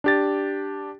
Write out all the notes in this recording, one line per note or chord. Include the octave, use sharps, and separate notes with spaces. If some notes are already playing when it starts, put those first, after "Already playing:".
D4 G4 A6